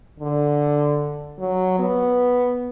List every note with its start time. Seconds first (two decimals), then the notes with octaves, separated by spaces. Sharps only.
0.20 D3
1.39 F#3
1.79 B3